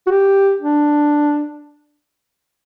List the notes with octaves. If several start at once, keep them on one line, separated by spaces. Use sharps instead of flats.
F#4
G4
D4